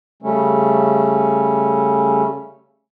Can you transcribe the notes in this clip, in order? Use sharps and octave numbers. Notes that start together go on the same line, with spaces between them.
C#3 G3 A3 C#4